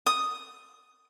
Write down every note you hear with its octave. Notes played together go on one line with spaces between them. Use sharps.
D#6